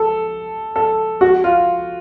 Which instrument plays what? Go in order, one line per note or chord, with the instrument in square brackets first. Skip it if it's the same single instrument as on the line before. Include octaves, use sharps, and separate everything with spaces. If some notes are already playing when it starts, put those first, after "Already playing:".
Already playing: [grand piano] A4
A4
F#4
F4